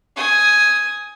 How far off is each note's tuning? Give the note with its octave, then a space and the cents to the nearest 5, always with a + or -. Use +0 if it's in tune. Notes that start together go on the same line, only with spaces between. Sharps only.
G#5 +0 D#6 +15